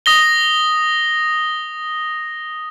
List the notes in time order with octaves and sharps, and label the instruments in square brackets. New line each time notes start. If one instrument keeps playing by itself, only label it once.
[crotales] D#6 A#6 G7